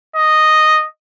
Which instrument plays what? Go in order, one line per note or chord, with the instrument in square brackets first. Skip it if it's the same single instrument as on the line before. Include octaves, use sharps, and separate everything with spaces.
[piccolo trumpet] D#5